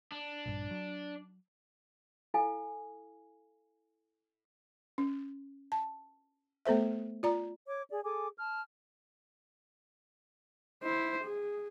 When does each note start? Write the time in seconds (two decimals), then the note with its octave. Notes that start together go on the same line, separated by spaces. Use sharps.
0.12 D4
0.46 A#1 G2
0.71 F#3
2.34 E4 A4 F5 G#5
4.98 C#4
5.72 A5
6.66 A3 B3 A4 C5 E5
7.23 F4 D5 A#5
7.67 C#5 D6
7.90 G#4 D5
8.03 G#4 A4 G#5 D6
8.37 A5 F6
10.84 E4 C5
11.24 G#4